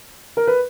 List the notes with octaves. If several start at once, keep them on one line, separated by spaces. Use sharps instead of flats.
A#4
B4